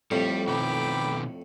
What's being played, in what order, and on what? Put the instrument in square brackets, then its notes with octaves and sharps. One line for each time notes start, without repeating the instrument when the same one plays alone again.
[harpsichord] F2 A2 [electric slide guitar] G3
[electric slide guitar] B2 D#3 B3 [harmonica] G5 B5 D6